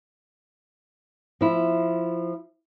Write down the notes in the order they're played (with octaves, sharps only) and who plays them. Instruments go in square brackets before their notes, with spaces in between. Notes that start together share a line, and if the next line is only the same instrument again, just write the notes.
[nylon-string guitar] F3 E4